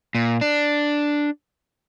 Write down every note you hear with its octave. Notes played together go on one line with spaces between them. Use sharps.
A#2
D4